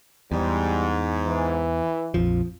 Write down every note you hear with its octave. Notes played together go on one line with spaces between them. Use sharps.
E2 G#2 G3
E3
A#1 F2 F3